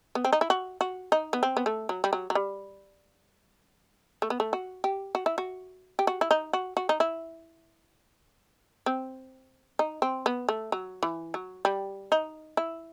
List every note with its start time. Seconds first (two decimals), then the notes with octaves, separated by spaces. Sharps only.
0.15 B3
0.25 C4
0.33 D#4
0.41 E4
0.50 F#4
0.81 F#4
1.12 D#4
1.33 B3
1.43 C4
1.57 B3
1.66 A3
1.89 F#3
2.04 G3
2.13 F#3
2.30 F#3
2.35 G3
4.22 A3
4.30 B3
4.40 A3
4.53 F#4
4.84 G4
5.15 F#4
5.26 E4
5.38 F#4
5.99 G4
6.07 F#4
6.21 E4
6.31 D#4
6.53 F#4
6.77 F#4
6.89 D#4
7.00 E4
8.86 C4
9.79 D#4
10.02 C4
10.26 B3
10.49 A3
10.72 F#3
11.03 E3
11.34 F#3
11.65 G3
12.12 D#4
12.57 E4